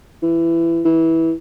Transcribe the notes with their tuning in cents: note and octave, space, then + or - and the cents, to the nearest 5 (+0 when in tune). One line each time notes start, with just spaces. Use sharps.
E3 +20
E3 -15